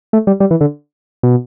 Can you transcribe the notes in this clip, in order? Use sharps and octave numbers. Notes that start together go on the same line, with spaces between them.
A3
G3
G3
E3
D3
B2